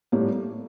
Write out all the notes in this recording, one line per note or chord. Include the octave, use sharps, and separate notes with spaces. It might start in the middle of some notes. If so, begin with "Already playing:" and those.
A2 G3 A#3